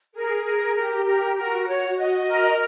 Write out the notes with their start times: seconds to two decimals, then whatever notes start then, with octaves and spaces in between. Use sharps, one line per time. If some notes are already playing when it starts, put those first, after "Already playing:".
0.13 G#4 A#4
0.45 A#4
0.75 G4 A#4
1.05 A#4
1.36 F#4 A#4
1.67 C#5
1.98 D#5
2.28 A#4